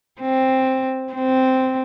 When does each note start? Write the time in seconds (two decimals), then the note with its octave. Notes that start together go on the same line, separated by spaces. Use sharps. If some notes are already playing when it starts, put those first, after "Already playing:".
0.20 C4
1.13 C4